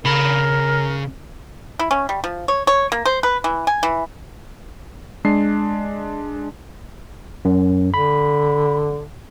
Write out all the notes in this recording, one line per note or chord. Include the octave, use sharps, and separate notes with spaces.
C#3 A#4 B5
E4
C#4
G3
F3
C#5
C#5
A#3
C5
B4
E3
G#5
E3
G#3 D4 C7
F#2
D3 B5